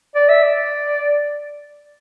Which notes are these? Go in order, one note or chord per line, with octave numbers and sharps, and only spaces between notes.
D5
E5
D5